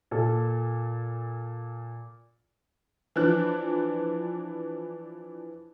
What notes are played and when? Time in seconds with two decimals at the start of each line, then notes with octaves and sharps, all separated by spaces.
0.11 A#2 A4
3.16 E3 F3 D4 F#6